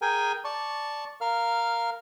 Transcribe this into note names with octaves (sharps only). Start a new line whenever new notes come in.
G#4 A#4 G5 G#5
D5 A5 C#6
A#4 F5 F6